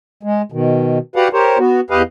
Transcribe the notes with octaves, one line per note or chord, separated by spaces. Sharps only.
G#3
B2 D#3
F#4 G4 B4 D5 F5 F#5
G4 A#4 C5 C#5
B3 F#4
E2 G4 B4 D#5 F5